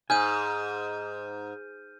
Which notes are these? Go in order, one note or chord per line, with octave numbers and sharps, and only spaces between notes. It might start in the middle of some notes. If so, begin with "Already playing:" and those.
G#2 G#5 F6 G6 D#7